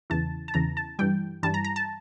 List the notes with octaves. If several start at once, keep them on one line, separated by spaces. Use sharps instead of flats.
E2 C#3 E3 A5
A5
E2 C#3 E3 A#5
A5
G2 E3 G3 G5
G2 E3 G3 A5
A#5
A#5
A5